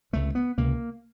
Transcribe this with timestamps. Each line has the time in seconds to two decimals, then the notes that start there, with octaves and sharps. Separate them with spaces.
0.13 C#2 C3 A3
0.35 B3
0.57 C#2 C3 A#3